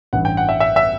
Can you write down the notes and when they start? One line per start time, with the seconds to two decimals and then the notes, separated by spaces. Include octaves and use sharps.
0.13 A1 G2 E3 F#5
0.25 G5
0.37 F#5
0.49 E5
0.60 E5
0.76 E5